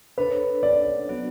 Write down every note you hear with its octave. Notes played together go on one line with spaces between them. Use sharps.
D4 A4 B4 C#5
D5
F#3 B3 D4 F#4